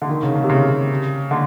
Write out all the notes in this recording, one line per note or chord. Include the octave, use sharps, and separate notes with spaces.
D3
D#3
C#3
C#3
C3
C#3
D3